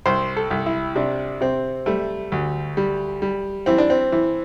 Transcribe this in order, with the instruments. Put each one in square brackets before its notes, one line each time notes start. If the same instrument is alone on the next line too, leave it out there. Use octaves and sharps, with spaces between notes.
[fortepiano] C2 C5
A4
C2
E4
C3 D4
C3 C4
G3 A3
D2
G3
G3
E3 C4
D4
C4
E3